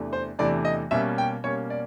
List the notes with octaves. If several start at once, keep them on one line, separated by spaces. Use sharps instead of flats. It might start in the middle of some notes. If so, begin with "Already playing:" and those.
Already playing: E2 C3 E3 A3 D4
C5
E2 C3 E3 A3 D4 D5
D#5
B2 G3 A#3 C#4 E5
G5
B2 G3 A#3 C#4 C#5
D5